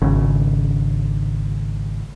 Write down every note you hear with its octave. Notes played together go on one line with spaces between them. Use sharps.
G#1 C#3